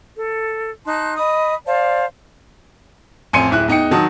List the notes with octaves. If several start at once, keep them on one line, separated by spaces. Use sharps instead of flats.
A4
D#4 A5 C6 F#6
D#5 B5 D#6
C5 D5 F5 A5
A1 F2 G#5 C6 C#7 D#7
D1 E4 F#6
E2 D#4 G5 C#7
D#3 F#3 A5 D#6